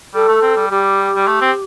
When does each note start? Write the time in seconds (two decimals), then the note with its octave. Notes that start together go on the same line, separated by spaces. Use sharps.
0.14 G3 A4
0.28 A3
0.42 C4
0.56 G3
0.70 G3 G4
1.15 G3
1.27 A3
1.41 C4